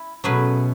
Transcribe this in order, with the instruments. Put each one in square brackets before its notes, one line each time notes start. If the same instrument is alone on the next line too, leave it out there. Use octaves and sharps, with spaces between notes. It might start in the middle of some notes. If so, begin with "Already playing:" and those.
Already playing: [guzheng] E4
[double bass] B2 [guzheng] F#3 A3 C#4 G#4 B4